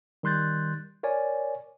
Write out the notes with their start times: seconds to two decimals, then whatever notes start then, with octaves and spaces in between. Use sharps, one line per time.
0.23 D#3 G3 C6 F#6 G6 A6
1.03 A#4 C#5 D5 G#5